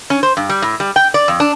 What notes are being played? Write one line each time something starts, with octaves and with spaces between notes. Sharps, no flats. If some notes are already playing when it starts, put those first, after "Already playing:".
C#4
C5
G2
G3
A2
G3
G5
D5
F2
D4